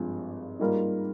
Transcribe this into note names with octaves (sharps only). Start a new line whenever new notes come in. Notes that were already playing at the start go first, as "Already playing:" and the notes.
Already playing: G#1 G2 F3 G#3
G#2 G3 A#3 F4 A#4